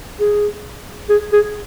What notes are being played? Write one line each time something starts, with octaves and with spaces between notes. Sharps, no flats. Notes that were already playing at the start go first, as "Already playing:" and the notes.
G#4
G#4
G#4